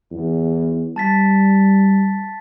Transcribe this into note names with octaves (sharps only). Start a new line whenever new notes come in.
E2
G3 A5 A6 B6